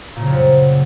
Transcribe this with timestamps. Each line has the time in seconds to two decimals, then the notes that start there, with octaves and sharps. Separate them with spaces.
0.16 A#2
0.21 C#3
0.26 F2
0.31 F#2